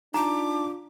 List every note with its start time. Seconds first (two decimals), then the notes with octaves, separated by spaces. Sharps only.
0.14 D4 D#4 F4 A5 A#5 D6